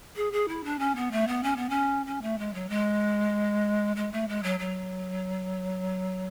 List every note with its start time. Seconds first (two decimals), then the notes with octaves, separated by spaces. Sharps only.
0.16 G#4
0.32 G#4
0.48 E4
0.64 D4
0.79 C#4
0.96 B3
1.11 A3
1.28 B3
1.43 C#4
1.57 B3
1.70 C#4
2.06 C#4
2.22 A3
2.39 G#3
2.54 F#3
2.69 G#3
3.96 G#3
4.12 A3
4.28 G#3
4.43 F#3
4.59 F#3